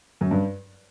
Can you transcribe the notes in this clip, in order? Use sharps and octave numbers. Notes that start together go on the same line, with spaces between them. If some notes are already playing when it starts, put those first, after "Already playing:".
F#2
G2